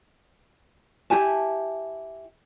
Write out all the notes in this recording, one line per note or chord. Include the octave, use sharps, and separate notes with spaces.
E4 G4 G#5 A5